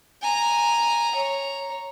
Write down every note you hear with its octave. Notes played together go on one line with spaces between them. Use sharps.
G#5 A#5
C#5 A#5